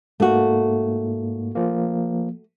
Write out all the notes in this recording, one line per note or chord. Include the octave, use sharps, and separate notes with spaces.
G#2 A3 A#3 F#4
F3 A#3